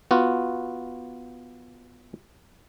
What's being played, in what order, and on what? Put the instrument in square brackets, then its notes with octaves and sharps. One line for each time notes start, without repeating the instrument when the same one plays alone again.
[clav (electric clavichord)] B3 F4 F#4